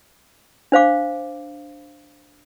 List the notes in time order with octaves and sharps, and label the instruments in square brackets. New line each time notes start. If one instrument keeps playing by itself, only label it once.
[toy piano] D4 C5 F5 D6